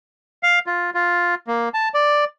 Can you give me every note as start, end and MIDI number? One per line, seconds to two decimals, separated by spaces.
0.43 0.59 77
0.66 0.90 65
0.94 1.35 65
1.47 1.69 58
1.74 1.89 81
1.94 2.25 74